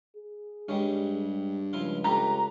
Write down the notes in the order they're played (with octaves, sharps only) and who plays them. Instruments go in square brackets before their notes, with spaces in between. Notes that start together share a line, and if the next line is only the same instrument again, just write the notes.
[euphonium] G#4
[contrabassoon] G2 [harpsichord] G3 G#3 C#4
[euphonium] C#2 [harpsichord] F3 E4 F4
[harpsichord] A3 G4 B4 [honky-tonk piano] A#5